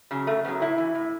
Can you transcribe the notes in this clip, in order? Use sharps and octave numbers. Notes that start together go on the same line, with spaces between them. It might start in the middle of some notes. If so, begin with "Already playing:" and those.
C#3 F#3
F#2 A3
C#3 F#3 B3
A2 E4
E3
A2